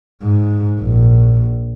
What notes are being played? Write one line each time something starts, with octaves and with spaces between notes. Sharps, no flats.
G#2
A#1